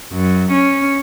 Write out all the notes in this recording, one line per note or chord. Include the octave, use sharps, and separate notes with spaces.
F#2
C#4